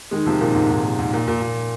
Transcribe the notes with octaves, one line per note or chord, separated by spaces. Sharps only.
D#3 G#3
C3 F3
A#2 D#3
G#2 C3
G#2 C3
A#2
G#2
A#2
A#2
A#2